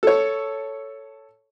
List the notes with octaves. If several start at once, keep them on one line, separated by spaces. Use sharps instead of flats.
A4 C#5